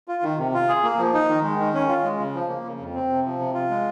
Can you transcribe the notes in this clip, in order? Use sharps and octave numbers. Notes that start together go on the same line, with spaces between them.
F4
D#3
C3
F4
G#4
A#3
F3
D#4
D#3
G#3
D#3
C#4
F4
G#3
C#3
F3
A#3
C#3
F2
C4
C3
F3
C3
F4
G#3